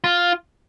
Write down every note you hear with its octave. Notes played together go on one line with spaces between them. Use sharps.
F4